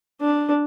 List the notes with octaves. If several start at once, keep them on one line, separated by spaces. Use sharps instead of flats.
D4